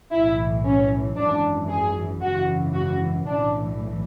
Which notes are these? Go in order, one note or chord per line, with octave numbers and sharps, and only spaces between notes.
B1 A2 E3 E4
C#4
G#1 F#2 E3 D4
G#4
G#1 F#2 C#3 E3 F#4
F#4
B1 A2 E3 D4